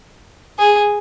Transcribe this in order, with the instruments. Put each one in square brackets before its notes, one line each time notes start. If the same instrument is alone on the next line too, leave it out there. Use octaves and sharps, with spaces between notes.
[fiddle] G#4